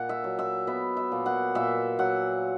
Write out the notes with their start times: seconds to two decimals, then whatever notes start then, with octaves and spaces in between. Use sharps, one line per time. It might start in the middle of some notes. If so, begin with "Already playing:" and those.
Already playing: A#2 F#5
0.09 E5
0.24 F#3
0.39 E5
0.67 B3 E5
0.97 E5
1.12 A#2
1.26 F#5
1.55 A#2 E5
1.99 F#3 F#5